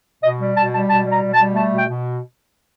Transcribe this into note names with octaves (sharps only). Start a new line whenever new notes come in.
B2 D#5
G3
B2 A5
G3 A5
B2 A5
G3
A#5
B2
A5
G3
A3 A5
B2
G5
B2